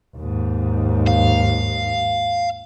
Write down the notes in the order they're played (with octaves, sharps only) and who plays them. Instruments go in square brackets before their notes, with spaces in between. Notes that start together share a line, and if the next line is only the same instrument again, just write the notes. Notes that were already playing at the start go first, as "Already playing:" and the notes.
[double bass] D#2 G#2
[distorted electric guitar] F5